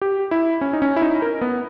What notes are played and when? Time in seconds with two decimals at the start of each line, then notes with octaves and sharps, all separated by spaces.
0.02 G4
0.31 E4
0.61 C#4
0.73 D#4
0.82 C#4
0.96 E4
1.02 D#4
1.22 A#4
1.41 B3